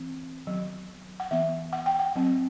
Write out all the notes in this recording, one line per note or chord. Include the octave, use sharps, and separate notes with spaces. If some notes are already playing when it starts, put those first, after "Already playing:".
Already playing: E3 C4
D#3 F#3 B3
F#5
E3 B3 E5
F#5
G5
F#5
F#3 C4